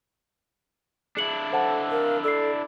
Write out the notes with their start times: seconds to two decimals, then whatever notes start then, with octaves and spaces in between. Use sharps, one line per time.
1.17 D4 E4 G#4 C#7 F#7
1.53 A4 C5 F#5 A5
1.91 A#4 F5
2.24 A4 D5 E6 C7